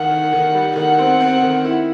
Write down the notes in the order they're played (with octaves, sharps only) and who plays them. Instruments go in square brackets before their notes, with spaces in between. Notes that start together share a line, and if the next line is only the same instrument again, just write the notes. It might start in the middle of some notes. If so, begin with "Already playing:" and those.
Already playing: [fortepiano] D#3 [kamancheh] F#5
[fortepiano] D#3
D#3
G3
[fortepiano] D#3 [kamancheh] F#5
[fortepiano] C4
C4
D#3
E4